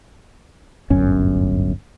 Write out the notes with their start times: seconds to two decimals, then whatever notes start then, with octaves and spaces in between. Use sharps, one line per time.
0.90 D1 G1 F#2 C#4